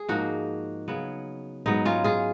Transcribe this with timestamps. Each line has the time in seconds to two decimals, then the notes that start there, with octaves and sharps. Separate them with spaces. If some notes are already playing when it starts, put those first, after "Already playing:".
Already playing: G#4
0.09 G#2 F3 A#3 D#4 F#4
0.88 C#3 F#3 B3
1.66 G#2 F#3 B3 D#4
1.85 C#4 F4
2.04 F4 G#4